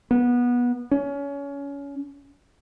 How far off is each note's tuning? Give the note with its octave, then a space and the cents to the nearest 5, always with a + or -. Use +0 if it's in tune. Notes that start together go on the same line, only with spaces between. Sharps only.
B3 -20
C#4 +25